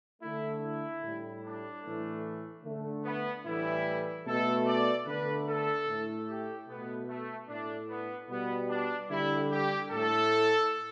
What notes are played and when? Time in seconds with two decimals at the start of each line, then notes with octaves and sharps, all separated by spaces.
0.22 D3 A3 E4
0.62 E4
1.03 A2 G3
1.43 D4
1.83 A2 E3 A3
2.64 D3 A3
3.05 B3
3.45 A2 E3 G3 E4
4.25 B2 A3 A4
4.66 D5
5.06 D3 A3 B4
5.47 A4
5.87 A2 A3
6.28 G4
6.67 B2 A3 B3
7.08 A3
7.48 A2 A3 D4
7.89 B3
8.29 B2 G3 B3
8.69 D4
9.10 D3 G3 E4
9.50 G4
9.91 A2 A3 A4